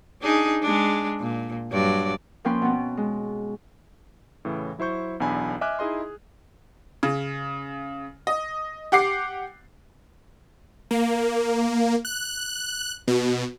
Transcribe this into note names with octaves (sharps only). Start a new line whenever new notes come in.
D4 D#4 G#4
G#3 D4
A#2
G2 F#3 D5
F3 A#3 C#4 B4 G5 C6
B2 B3
G#3
A2 C#3 E3
F#3 E4 C5 C#6 G6
B1 E2 D4 G#5 B5
D#5 E5 G#5 D6 F6 F#6
D#4 E4 G#4 D#5 C6
G#4
C#3
D#5
G4 F#5 D6 C7
A#3
F#6
B2